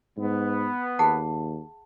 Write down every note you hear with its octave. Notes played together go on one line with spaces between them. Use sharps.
G#2 B3
D#2 G#4 F#5 A5